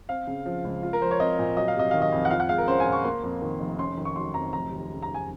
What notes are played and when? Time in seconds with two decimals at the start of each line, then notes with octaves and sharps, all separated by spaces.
0.09 C4 F5
0.27 C#3
0.46 F3
0.64 C#2
0.83 F4
0.93 A#4
1.01 F3 C5
1.11 C#5
1.20 C4 D#5
1.39 A#2
1.57 F#3 D#5
1.68 F5
1.76 C3 D#5
1.91 D#3 F5
2.02 D#5
2.12 F2
2.25 F#5
2.30 F4 F5
2.40 F#5
2.49 G#3 F5
2.58 A#4
2.68 C#4 C5
2.80 G#5
2.86 A#2
2.92 C#6
3.05 A#3 C6
3.23 F2
3.42 D#3
3.60 F1
3.78 C#4 C6
3.97 D#3
4.05 C#6
4.15 F#3 C6
4.34 F2 A#5
4.53 F1 A#5
4.71 D#2
4.90 C#3
5.02 A#5
5.08 F1
5.14 G#5